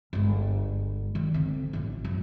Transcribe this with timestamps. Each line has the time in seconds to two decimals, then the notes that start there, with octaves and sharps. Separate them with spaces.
0.13 G1 G#3
1.15 D#3
1.34 D3 C4
1.73 A1 F4
2.05 F#2